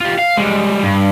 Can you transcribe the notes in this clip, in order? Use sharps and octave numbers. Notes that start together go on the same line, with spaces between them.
F4 G4
F5
G3 G#3
G2